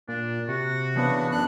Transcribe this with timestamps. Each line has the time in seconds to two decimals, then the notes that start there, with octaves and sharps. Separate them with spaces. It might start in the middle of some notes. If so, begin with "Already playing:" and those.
0.08 A#2 D4
0.48 C3 F#4
0.96 E2 C#3 B3 D4 B4
1.32 F#2 D4 F#6